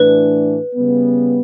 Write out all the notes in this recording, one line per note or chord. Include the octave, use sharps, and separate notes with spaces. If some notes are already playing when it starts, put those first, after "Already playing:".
Already playing: A2 E3 A3 D4 B4
C#3 G3 B3